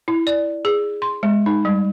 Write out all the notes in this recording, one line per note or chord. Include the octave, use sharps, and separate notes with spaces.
E4
D5
G#4
C6
G#3
D#4
G3